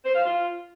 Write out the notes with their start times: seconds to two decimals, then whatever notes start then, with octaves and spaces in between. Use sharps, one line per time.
0.05 C5
0.15 F5
0.25 F4